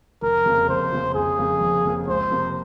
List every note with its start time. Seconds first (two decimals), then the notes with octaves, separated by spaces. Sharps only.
0.22 F1 A#4
0.46 F2 C#3 F3 A#3
0.69 F1 C5
0.93 F2 C#3 F3 A#3
1.15 F1 G#4
1.39 F2 C#3 F3 A#3
1.61 F1
1.85 F2 C#3 F3 A#3
2.07 C#2 C5
2.31 C3 F3 A#3